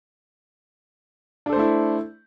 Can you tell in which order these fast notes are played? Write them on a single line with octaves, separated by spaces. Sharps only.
D4 A4 C5 A3 E4